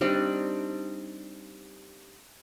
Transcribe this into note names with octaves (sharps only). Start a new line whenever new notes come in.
G3 C4 D4 D#4